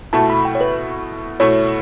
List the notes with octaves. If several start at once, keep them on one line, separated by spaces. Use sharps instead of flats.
B2 A3 E4 A5
B5
G5
C#5
B4
B2 A3 E4 C#5